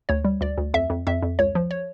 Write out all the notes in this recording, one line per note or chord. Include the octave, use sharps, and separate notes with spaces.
D2 C#5
G3
D2 D5
D2
F2 E5
F2
F2 E5
F2
C#2 C#5
F3
C#5